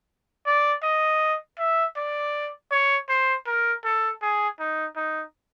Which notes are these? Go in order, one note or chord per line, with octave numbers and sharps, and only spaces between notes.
D5
D#5
E5
D5
C#5
C5
A#4
A4
G#4
D#4
D#4